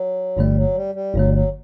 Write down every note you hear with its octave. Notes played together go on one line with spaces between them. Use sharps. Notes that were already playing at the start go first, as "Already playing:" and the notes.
Already playing: F#3
G1 G2 D3 G3 A3
F#3
G3
G3
G1 G2 D3 F#3 A3
G3
F#3